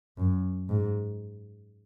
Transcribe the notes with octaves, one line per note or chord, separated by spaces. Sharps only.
F#2
G#2